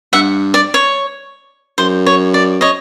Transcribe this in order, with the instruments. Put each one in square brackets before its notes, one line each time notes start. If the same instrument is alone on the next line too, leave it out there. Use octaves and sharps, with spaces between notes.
[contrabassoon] G2 [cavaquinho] E5 F#5
[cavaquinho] D5
C#5
[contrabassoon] F#2 [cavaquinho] C5
[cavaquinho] C#5
D5
C#5 D#5